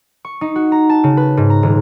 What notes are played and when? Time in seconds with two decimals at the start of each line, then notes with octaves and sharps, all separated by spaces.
0.25 C#6
0.41 D#4
0.55 F#4
0.72 A#5
0.89 A5
1.04 C#3
1.17 B4
1.37 G#2
1.50 A#5
1.63 D#1